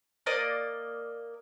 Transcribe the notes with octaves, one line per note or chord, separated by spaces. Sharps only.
A#3 D5 D#5 D#6